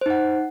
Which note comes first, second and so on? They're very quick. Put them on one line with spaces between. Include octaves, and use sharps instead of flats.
C5 D#4 F#5